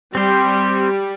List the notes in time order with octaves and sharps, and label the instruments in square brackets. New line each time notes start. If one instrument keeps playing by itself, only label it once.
[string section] G3 [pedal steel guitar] C4 G4 C5